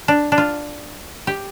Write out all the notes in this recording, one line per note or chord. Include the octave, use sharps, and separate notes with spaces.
D4
D4
F4
G4